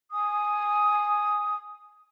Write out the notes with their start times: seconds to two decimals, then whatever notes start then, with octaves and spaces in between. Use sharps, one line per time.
0.12 G#5 D#6